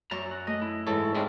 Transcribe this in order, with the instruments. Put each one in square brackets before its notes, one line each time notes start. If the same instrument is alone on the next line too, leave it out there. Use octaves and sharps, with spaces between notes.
[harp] F#2 E5 C#6 [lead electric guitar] D5 A#5
[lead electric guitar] F#4
[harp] A3 [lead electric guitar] D#5
[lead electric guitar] E4
[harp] G#2 [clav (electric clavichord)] E3 A4 C#5
[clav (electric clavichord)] G#2 G#3 C4 [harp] B4 D5 F5